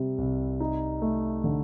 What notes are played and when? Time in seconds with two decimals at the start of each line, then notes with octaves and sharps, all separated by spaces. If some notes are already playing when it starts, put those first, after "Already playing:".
Already playing: C3 G3 C4
0.18 C2
0.60 D#4
1.02 A3
1.44 D3